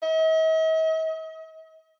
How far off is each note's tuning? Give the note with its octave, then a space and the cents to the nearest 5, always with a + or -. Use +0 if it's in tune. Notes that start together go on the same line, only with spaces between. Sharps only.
D#5 +45